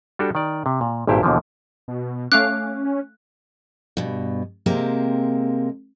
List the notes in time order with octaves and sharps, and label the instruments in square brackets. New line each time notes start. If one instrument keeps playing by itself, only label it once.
[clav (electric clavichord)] G3 D4 F#4 G4 A4
D#3 D5
C3
A#2
G#1 G2 A#2 E4 G4 C5
D#2 B2 D3 E3 F3
[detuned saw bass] B2
[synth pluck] A3 F5 D6 [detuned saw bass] C#4 [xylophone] F#6
[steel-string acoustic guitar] G2 B2
C3 G#3 A#3 C4